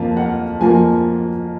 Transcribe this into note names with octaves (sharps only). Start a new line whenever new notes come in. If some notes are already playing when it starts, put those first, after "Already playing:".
Already playing: F2 F3 A#3 F5
F#5
F2 F3 A#3 G#5